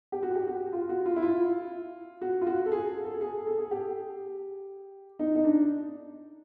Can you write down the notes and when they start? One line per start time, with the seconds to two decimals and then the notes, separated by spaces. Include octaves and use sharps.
0.12 G4
0.23 F#4
0.35 G4
0.48 F#4
0.73 F4
0.89 F#4
1.06 F4
1.16 E4
1.22 F4
2.21 F#4
2.41 F4
2.47 F#4
2.66 A4
2.72 G#4
3.04 A4
3.21 G#4
3.47 A4
3.58 G#4
3.71 G4
5.19 D#4
5.35 D#4
5.44 D4